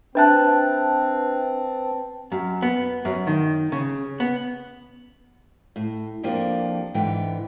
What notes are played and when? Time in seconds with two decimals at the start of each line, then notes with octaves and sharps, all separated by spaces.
0.15 C4 D4 B4 E5 G5 A5 F#6
2.32 F#2
2.62 B3
3.05 F#2
3.27 D#3
3.72 C#3
4.20 B3
5.76 A2
6.23 F2 F3 A#3 D4 G4
6.94 G#2 D3 E3 B3 G5